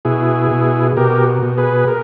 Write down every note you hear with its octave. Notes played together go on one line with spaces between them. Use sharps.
B2 E4 G#4
B2
B2 G4 A#4
B2
G#4 B4
A#4